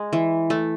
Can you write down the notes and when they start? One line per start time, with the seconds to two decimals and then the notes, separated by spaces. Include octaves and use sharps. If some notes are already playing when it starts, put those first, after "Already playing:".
Already playing: G#3
0.13 E3
0.50 A3